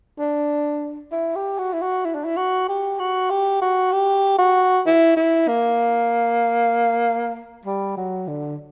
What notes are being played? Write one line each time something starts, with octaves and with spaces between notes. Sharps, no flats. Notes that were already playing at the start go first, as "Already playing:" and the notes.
D4
E4
G4
F#4
E4
F#4
E4
D4
E4
F#4
G4
F#4
G4
F#4
G4
F#4
E4
E4
A#3
G3
F#3
D3